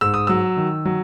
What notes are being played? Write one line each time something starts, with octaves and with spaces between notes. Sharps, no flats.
G#2 E6
D#6
F#3 E6
D#3
F#3